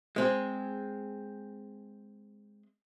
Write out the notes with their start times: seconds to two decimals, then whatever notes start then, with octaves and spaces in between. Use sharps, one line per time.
0.16 G#3 C4 G#4